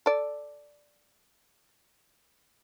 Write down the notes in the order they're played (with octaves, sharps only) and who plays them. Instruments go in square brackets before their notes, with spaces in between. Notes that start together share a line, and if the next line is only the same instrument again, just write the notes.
[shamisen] A4 D5